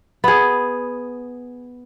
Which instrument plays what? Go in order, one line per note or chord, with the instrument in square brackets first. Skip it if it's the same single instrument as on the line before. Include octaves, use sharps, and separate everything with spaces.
[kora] B3 G#4